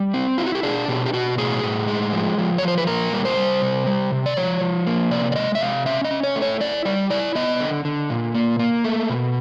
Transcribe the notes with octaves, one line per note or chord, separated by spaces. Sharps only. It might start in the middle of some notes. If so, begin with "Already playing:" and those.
Already playing: G3
C4
E4 F4
F#4
G4
D4 G#4
B2 G4
G4
B2 F#4
A2 G#4
A2
G#3
F3
F3
C#5
F3
C5
B4
A#2 A#4
G3
C5
G3
C3
G3
C3
D5
F3 C#5
F3
A#3
C3 D5
D5
G#3 D#5
E5
C3 F5
C#4 E5
D#5
C#4
C#5
A3
C#5
E4 D5
G3 D5
E4 D5
B3 D#5
D3
D3
A#2
A#3
A#3
A3
B2